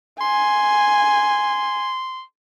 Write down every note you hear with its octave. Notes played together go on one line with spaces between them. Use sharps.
G#5 C6